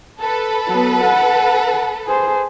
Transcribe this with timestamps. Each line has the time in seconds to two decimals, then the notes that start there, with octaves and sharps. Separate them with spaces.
0.20 A4 B4
0.67 F#3 B3
1.04 F#5
2.06 G#4 C5